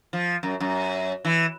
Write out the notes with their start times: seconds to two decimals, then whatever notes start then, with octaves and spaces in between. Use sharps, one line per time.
0.13 F3
0.43 F#2
0.60 F#2
1.25 E3